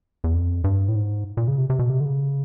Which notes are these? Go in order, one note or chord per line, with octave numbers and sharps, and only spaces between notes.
E2
F2
G2
A2
G#2
A#2
C#3
C3
C3
B2
C3
D3
C#3